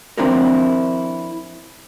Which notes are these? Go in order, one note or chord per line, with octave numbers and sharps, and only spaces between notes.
F3 C4 D4 E4 F#4 A#4